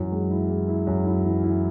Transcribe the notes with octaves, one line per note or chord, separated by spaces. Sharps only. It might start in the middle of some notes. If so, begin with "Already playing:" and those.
Already playing: F#2 E3
G#3
E4
G#3
E4
F#2
E4
E3
E4